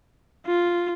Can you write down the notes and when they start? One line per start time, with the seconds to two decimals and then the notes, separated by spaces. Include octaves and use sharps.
0.47 F4